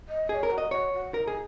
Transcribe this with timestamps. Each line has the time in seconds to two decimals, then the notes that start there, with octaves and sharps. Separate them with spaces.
0.08 D#5
0.29 G#4 D#5
0.34 C#5
0.43 A#4
0.50 F#4
0.58 D#5
0.71 F#4 C#5
0.93 F#4
1.14 D#4 F#4 A#4
1.27 G#4